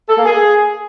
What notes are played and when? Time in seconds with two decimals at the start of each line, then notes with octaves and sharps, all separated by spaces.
0.09 A4
0.17 A#3
0.25 G#4